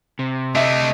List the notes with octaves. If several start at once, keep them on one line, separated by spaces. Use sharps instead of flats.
C3
A3 D4 D#5 E5